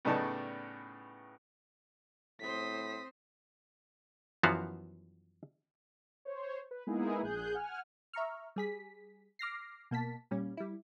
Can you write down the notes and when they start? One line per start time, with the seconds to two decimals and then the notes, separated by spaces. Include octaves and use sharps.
0.05 A2 C#3 B3 D#4 D5 A5
2.41 A2 C4 C5 D#6 B6
4.43 F#2 E3 F3 B3 F#4 F5
6.25 C5 C#5
6.71 B4
6.87 G#3 A#3 B3 D#4 E4 G#4
7.23 A#1 G#4 F#6 G6
7.55 F#5 G#5 F6
8.13 E5 A#5 C#6 F6
8.56 G3 G#4 B6
9.39 D6 F6 A#6 C7
9.91 B2 A#3 A5 B6
10.31 A#2 G3 C#4
10.57 G3 E4